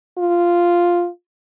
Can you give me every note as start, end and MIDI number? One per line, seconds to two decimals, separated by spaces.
0.18 1.08 65